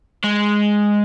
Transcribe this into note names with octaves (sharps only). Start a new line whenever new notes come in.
G#3